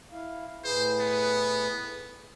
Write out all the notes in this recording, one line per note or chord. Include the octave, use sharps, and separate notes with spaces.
E4 F5
A2 G#4 B4 C5
B3